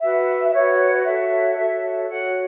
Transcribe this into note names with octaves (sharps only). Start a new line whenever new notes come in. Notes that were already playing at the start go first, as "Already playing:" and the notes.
F#4 B4 E5
E5
F#4 B4 C#5
C#5
F#4 A4 C#5 E5
F#4 A4 C#5 E5
F#4 C#5 F#5